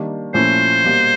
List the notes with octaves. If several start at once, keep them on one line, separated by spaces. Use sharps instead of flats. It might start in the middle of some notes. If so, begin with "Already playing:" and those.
Already playing: D#3 G3 A#3 D4
A#2 F3 A3 C#4 E4 C5
B2 G3 A#3